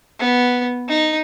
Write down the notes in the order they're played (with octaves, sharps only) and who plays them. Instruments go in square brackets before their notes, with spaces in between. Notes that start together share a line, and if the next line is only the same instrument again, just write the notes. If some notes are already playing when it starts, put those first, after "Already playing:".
[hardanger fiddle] B3
D#4